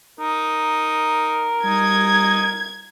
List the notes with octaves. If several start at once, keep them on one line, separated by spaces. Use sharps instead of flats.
D#4 A#4
G3 D#4 G#6